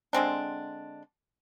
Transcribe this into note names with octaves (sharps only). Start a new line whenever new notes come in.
D3 G#3 C4 D4